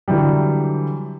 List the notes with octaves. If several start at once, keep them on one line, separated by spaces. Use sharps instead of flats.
D3 E3 F#3 G3